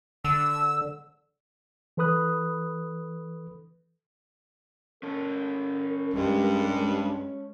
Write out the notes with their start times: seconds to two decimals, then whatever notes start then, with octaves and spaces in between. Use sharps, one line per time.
0.24 D3 E6
1.97 E3 A4 B4 B5 D#6 F#6
5.03 C#4 A4 A#4
6.14 G2 G#3